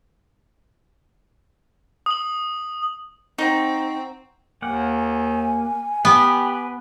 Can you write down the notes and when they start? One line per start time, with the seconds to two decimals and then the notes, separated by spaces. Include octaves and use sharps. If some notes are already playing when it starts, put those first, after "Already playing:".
2.06 D#6 F#7
3.38 C4 D#4 F#5 A#5 C#6
4.62 D#2 A#3 F#5 G#5
6.05 B3 G4 B4